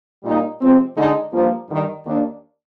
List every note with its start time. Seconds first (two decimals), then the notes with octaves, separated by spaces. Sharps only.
0.24 A#2 G3 A#3 D#4
0.60 C3 F3 G#3 C4
0.96 D3 G#3 D#4
1.32 G2 F3 A#3
1.69 G2 D#3 G3
2.05 D#2 D#3 A#3 D4